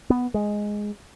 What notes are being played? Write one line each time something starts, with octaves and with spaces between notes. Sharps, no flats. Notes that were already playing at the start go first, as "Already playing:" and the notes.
B3
G#3